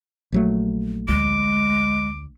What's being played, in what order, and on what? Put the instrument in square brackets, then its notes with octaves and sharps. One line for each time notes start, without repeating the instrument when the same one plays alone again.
[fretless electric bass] A#1 F#3 A3
[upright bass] D2 [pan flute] G#3 [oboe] D6